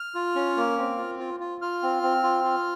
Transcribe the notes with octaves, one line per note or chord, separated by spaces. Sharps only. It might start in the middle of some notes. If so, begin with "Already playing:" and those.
Already playing: F6
F4
C#4
A#3
C4
F4
F4
F4
F4 F6
C4
C4
F4
F4